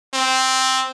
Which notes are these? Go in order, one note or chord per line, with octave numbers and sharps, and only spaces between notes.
C4